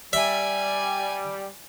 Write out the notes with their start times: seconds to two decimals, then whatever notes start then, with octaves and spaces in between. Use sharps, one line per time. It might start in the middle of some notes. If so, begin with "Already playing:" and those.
0.13 G3 D5 E5 G#5